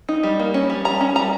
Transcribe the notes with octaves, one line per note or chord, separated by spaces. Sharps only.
D#4
G3
A#3
C#4
G3
G3 A#5
C#4
G3 A#5